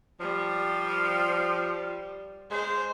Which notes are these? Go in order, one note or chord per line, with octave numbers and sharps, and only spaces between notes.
F3 G3
G#3 C5